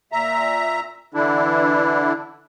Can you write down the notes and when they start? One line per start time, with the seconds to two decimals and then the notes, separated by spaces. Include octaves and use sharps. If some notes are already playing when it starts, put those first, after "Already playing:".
0.12 A#2 E5 A#5
1.14 D3 E3 D4 E4